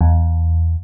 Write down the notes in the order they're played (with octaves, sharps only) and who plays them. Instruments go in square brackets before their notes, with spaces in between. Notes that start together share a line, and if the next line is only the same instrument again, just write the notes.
[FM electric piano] E2